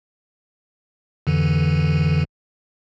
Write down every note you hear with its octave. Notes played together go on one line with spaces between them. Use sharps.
F2 D3 E3